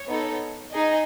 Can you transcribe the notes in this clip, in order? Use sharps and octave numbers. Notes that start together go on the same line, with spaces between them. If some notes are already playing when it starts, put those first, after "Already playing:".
Already playing: C#5
B3 D#4 A4
D#4 G#4 D#5